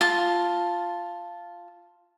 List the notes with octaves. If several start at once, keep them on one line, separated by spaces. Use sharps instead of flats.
F4 A5